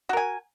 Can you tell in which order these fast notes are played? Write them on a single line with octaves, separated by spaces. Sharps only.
F#4 A#4 G#5